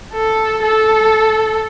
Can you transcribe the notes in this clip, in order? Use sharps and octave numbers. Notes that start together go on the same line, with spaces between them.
A4
A4